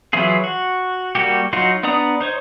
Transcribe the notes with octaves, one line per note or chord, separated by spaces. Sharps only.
E3 F#3 E4 F4 G#4
F#4
G3 A#3 F#4 G4
F#3 D#4 F4 F#4
B3 D4 D5 A#5 D#6
D#4 C5 C#5